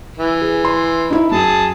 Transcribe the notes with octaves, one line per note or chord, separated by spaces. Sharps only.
E3
G#4
C6
D#4 E4 E5
F#2 G#4 A5